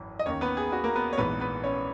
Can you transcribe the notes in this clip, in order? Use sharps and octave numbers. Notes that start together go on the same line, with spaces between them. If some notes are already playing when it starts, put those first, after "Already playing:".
Already playing: G#1 F#2 E3
D#5
D#2 D#3 C#4 C#5
B3 B4
G#4
F#4
A#3 A#4
B3 B4
C#5
A#1 G#2 E3 B3 B4
B3 B4
C#4 C#5